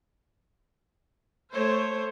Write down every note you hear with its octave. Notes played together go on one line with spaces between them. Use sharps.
A3 C5 C#5